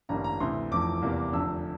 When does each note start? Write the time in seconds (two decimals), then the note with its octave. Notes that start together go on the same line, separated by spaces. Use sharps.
0.09 A1 G2 D3 G3 A#3 A#5
0.24 A#5
0.40 D2 C3 E3 C6
0.71 F1 F2 E3 A3 D6
1.02 E2 C3 G3 A#3
1.33 F1 F2 D3 E6